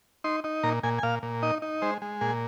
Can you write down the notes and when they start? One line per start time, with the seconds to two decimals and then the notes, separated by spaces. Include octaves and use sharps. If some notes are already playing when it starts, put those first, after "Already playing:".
0.24 D#4 C6
0.44 D#4
0.63 A#2 A#5
0.83 A#2 G#5
0.98 G#5
1.03 A#2 F5
1.23 A#2
1.42 D#4 D#5
1.62 D#4
1.82 G#3 C5
2.02 G#3
2.21 A#2 G#4